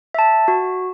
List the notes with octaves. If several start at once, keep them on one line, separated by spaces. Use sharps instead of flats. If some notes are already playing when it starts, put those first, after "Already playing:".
E5 A5
F#4